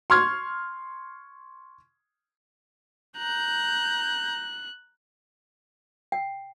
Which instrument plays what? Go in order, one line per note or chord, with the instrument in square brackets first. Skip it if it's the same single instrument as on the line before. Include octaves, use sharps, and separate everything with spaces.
[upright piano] C6 C#6 F6 G#6
[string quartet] A#5 G6 [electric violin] F#6
[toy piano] G5